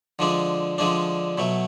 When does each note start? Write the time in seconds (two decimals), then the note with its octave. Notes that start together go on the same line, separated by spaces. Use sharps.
0.19 D3 F3 G#3 D4
0.78 D3 F3 G#3 D4
1.38 B2 F#3 A3